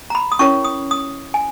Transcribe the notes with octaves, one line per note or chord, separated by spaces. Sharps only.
A#5
B5
D#6
C#4 E4 A#4 C#5 C#6
D#6
D#6
G#5